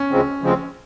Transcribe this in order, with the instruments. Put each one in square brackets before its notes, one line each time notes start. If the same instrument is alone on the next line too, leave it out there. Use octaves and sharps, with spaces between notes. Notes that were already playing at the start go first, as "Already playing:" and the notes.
Already playing: [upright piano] C#4
[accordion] D2 C#3 F3 G#3 C4
D2 C#3 F3 G#3 C4